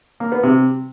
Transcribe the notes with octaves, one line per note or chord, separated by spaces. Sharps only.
A#3
B3
C3